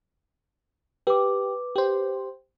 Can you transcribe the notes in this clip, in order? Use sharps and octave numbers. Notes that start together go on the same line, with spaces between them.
G4 B4 D6
G4 C5